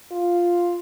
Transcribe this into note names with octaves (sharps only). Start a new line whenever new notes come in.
F4